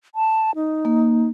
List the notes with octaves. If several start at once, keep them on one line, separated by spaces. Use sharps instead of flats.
A5
D#4
A#3